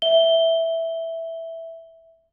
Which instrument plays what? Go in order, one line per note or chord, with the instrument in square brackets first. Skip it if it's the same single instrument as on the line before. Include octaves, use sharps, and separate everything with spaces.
[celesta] E5 G7